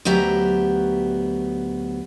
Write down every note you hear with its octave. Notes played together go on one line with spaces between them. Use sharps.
D2 F#3 B3 G4 E5 A#5